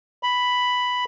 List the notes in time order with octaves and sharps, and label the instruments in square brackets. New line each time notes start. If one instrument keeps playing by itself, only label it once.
[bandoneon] B5